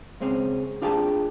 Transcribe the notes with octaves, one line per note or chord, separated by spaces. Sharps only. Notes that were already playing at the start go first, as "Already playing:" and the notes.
C#2 G#3 C4 C#4
D4 F4 G4 G#4 A5